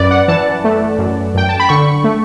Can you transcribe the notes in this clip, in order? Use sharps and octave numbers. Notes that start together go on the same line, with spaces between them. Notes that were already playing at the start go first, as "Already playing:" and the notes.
Already playing: F#2 B4 D5
F#5
E3 A5
A3
F#2
F#2 G5
A5
B5
D3 C#6
A3